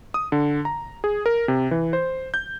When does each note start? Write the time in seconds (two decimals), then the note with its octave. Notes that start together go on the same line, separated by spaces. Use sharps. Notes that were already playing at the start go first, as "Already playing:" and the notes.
0.14 D#6
0.32 D3
0.65 A#5
1.04 G#4
1.26 A#4
1.48 C3
1.71 E3
1.93 C5
2.34 G6